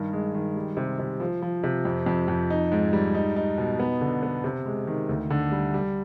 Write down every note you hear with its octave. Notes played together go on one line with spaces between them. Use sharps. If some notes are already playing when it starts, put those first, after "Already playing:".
Already playing: G2 D#3
G#3
D#3
G3
C3
C3
F3
F3
C3
F2
F2
F2
D#4
G#2
G3
D#4
D#4
B2
B3
D3
B3
C3
G#3
D#3
D2
D3
G3
G3